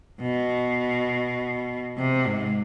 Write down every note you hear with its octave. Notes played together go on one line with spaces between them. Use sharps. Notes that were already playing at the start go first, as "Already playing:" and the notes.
B2
C3
G#2